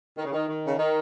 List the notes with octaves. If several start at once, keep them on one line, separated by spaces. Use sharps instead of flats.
D#3
C#3
D#3
D#3
C#3
D#3